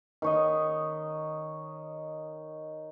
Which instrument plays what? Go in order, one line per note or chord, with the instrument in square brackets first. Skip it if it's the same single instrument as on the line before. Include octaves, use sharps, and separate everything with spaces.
[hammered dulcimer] D#3 C#5 D#5